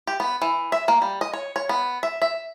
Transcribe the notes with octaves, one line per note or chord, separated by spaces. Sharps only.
G4
B3
E3
E5
A#3
G3
D#5
C#5
C#5
B3
E5
E5